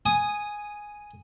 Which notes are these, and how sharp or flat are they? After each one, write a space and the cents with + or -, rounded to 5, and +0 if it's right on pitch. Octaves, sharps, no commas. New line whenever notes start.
G#5 +0 D#6 -10